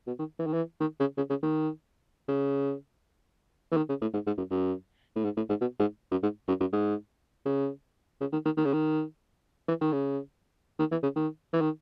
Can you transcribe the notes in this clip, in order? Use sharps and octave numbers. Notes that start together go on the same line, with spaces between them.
B2
D#3
E3
D#3
E3
D#3
C#3
C#3
C#3
D#3
C#3
E3
D#3
C#3
A2
G#2
G#2
F#2
F#2
A2
G#2
A2
G#2
B2
G#2
F#2
G#2
F#2
F#2
G#2
C#3
C#3
D#3
D#3
D#3
C#3
D#3
E3
D#3
C#3
D#3
E3
C#3
D#3
E3
D#3